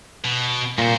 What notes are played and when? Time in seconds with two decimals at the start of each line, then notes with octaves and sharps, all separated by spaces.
0.25 B2
0.78 C2 A#2 C5